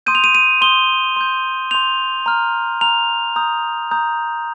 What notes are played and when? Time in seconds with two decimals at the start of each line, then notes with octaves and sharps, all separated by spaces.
0.06 C6 D#6 G6 D#7
0.15 F7
0.24 D#7
0.35 D#7
0.61 C6 D#6 G6 G7
1.16 C6 G6
1.71 C6 G6 F7
2.26 A#5 F6
2.81 A#5 F6 F7
3.36 A#5 D#6 G6
3.91 A#5 D#6 G6